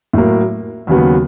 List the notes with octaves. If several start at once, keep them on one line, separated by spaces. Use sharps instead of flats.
A2 F#3 A#3
D#2 C#3 F#3 B3